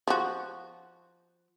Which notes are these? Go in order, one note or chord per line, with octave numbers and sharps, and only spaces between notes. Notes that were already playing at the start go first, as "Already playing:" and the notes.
F3 F#4